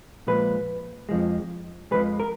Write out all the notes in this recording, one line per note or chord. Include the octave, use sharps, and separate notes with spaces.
A#2 F3 G#3 B4
F2 F3 G#3
F2 F3 G#3 B4
A#4